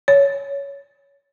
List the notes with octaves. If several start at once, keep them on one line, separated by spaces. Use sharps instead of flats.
C#5